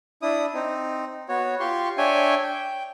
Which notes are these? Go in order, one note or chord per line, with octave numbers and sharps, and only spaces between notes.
D4 E4 D#6
C4 D#4
B3 F#4 C#5
F4 G4 C6 C#6
D4 C#5 E5 G5 G#5
G5